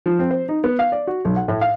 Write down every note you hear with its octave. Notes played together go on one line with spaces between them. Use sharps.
F3
C4
C5
D#4
B3
F5
D5
F#4
B1
F#5
A2
F5